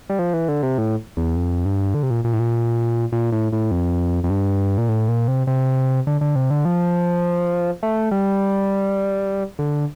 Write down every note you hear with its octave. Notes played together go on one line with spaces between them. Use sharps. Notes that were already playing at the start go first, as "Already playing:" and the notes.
G3
F3
E3
D3
C3
A2
E2
F2
G2
D3
C3
A#2
A#2
A2
A#2
A#2
A2
A2
F2
F2
G2
A#2
A2
A#2
C3
C3
D3
D3
C3
D3
F3
A3
G3
D3